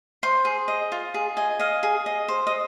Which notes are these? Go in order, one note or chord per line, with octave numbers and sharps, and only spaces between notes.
C5 C6
G#4
D#5
F4
G#4
D#5 G#5
D#5 F5
G#4
D#5
C5
D#5